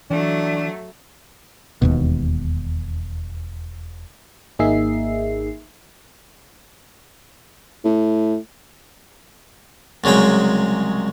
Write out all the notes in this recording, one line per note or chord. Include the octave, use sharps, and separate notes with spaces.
E3 F#3 A3 D4
E1 D#2 B2
G#1 A#3 D#4 G#4 E5 C7
A2
C2 C#3 F#3 G#3 G5